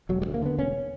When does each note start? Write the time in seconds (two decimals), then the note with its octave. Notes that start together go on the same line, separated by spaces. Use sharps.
0.09 E1 F#3
0.22 G3
0.26 D2
0.34 A#3
0.42 D3 B3
0.58 E1 C#4